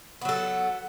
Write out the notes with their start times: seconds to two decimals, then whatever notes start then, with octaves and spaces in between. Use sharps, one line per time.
0.22 B3
0.25 F#3
0.29 A4